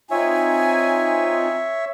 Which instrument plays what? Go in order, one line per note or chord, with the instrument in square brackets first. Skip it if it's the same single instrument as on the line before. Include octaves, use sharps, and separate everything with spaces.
[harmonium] C4 D#4 F4 [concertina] C#5 E5 [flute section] G#5